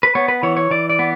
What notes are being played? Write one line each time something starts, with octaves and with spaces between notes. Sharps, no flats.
B4
B3 C#5
B4
E3 C#5
C#5
E3 D5
D5
B3